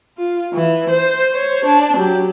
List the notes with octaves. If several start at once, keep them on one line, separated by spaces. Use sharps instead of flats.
F4
E3
C5
C5 C#5
D4
F#3 G4